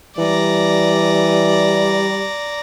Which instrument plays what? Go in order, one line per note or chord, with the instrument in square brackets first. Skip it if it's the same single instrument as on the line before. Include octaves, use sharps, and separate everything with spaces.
[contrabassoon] E3 [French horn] G3 [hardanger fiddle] D5 A#5